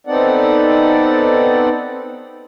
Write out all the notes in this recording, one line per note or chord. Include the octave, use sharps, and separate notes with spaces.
B3 C4 D#4 A4 D5 F#5